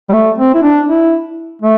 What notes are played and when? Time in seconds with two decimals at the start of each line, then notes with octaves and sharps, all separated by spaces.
0.09 G3
0.13 A3
0.38 C4
0.54 E4
0.63 D4
0.88 E4
1.62 A3